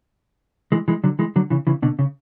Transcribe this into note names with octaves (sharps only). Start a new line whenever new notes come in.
E3 G#3
E3 G#3
D3 F#3
E3 G#3
D3 F#3
C#3 E3
C#3 E3
B2 D3
C#3